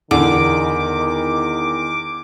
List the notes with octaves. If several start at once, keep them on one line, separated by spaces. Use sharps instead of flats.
E2 D3 D#3 D6